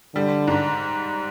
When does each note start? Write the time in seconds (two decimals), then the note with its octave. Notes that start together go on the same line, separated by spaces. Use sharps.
0.15 D3 G3
0.47 G#2